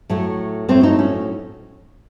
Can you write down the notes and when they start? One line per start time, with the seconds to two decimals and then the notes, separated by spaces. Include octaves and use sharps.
0.10 A2 F#3 A3
0.69 A2 F#3 A3 C4
0.83 D#4
0.99 C#4